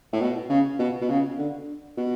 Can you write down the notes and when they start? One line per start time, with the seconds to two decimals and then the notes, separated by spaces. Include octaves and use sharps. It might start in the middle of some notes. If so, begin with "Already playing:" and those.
0.12 A2
0.20 B2
0.50 C#3
0.79 B2
1.01 B2
1.09 C#3
1.38 D3
1.97 B2